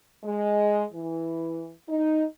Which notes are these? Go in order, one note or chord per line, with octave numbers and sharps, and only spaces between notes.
G#3
E3
D#4